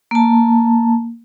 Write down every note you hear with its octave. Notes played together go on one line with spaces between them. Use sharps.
A#3 A5